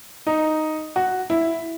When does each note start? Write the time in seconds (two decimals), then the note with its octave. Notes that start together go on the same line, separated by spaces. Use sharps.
0.27 D#4
0.96 F#4
1.30 E4